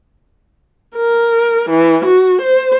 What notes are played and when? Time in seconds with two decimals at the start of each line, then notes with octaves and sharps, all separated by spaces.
0.96 A#4
1.70 E3
2.05 F#4
2.42 C5